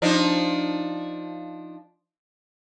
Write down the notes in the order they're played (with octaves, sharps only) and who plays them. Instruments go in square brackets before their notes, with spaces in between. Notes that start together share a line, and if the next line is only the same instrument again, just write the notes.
[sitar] F3 D4 D#4